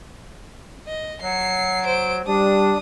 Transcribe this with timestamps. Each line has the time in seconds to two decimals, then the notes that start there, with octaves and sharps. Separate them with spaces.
0.87 D#5
1.21 F#3 C7 C#7
1.84 C5 D7
2.27 G3 D4 D#6